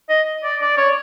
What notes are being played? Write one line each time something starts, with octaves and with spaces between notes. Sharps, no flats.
D#5
D5
D5
C#5